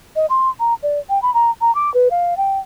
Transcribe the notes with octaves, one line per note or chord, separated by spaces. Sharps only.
D#5
C6
A#5
D5
G5
B5
A#5
A#5
D6
B4
F5
G5